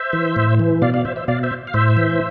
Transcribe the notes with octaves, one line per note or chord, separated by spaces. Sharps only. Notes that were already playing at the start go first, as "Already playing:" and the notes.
Already playing: C5 E5
E3
A2
E3
B2 D5 F5
D5 F5
C5 E5
C5 E5
B2 D5 F5
C5 E5
F5
A2 C5 E5
E3